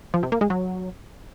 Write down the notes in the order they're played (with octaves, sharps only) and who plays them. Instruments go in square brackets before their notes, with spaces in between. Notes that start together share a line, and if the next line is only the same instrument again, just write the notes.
[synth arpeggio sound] F3
C3
A#3
G#3
F#3